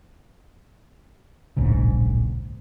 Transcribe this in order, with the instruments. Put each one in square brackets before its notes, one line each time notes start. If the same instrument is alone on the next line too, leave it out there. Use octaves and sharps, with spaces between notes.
[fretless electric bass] D1 A#1 G#2 C#3